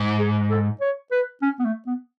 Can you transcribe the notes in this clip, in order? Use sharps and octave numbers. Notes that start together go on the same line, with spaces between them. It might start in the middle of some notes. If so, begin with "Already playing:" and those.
Already playing: G#2
G#4
A4
C#5
B4
C#4
B3
A3
B3